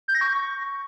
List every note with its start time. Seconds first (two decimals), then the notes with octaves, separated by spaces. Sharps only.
0.08 G6
0.15 A#6
0.21 C#6